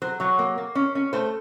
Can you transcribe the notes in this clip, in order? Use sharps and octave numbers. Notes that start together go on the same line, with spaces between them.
F#3 C5
F#3 C#5
A#3
A#3
C#4
C#4
A3 C5